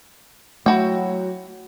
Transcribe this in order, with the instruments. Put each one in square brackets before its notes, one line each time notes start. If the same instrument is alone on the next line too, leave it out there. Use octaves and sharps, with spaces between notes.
[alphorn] F#3 [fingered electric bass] A3 [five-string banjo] E4 F#4 G5